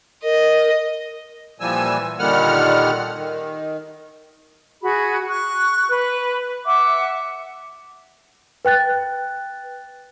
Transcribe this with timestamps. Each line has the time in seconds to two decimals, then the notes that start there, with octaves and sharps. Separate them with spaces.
0.24 A#4 D#5
1.60 A#2 E3 F3 G3 G#5 E6
2.19 A#2 D3 D#3 G3 F#5 F6
3.15 D#3
4.82 F#4 G#4 B5
5.27 C#6 F#6
5.88 B4
6.65 E5 F#5 D6
8.65 B4 G5 F#6 A6